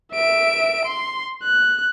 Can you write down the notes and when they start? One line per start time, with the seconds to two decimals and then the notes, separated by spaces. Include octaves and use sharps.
0.13 E5 D7
0.85 C6
1.43 F#6